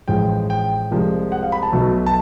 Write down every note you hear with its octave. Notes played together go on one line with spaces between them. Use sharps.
A1 A2 F3 G#3 G5
G5
C2 C3 F3 G#3
F#5
F5
B5
A5
B1 B2 F#3 A3
A5